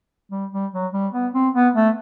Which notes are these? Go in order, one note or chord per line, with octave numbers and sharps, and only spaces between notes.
G3
G3
F#3
G3
B3
C4
B3
A3